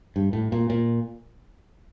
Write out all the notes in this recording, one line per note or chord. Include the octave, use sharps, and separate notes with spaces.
G2
A2
A#2
A#2